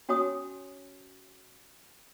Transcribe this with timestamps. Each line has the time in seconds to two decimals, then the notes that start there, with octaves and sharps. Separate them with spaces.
0.09 C#4 F#4 C#5 G#5 D#6